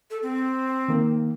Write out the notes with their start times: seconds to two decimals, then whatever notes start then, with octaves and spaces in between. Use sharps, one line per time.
0.11 A4
0.23 C4
0.88 D#3 A#3